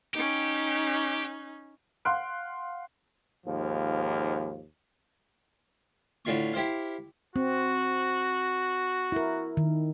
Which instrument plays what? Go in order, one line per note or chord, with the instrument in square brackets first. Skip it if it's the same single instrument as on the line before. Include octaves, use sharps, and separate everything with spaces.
[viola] C#4 D#4 [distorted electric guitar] G4
[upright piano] F5 F#5 C6 F6 F#6 D7
[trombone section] D#2 G#2 F3
[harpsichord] A2 D3 F4 C#6
E4 G4 C5 F5
[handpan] C4 [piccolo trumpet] F#4
[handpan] E4 A#4
D#3